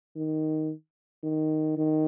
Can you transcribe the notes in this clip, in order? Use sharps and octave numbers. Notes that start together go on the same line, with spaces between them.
D#3
D#3
D#3